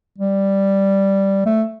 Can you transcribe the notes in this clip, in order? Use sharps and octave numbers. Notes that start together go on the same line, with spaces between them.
G3
A3